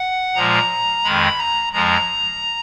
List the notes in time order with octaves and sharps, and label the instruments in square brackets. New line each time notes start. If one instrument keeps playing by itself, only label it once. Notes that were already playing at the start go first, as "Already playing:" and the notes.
Already playing: [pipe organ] F#5
A#2 F3 G#3 A#5
F2 D#3 G#3 B5
A#5
F2 F3 G#3 A#5